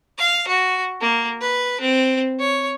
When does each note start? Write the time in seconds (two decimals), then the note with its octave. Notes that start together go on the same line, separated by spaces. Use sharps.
0.18 F5
0.48 F#4
1.01 A#3
1.41 B4
1.81 C4
2.40 C#5